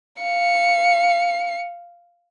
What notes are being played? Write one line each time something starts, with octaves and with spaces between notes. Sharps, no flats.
F5 C#7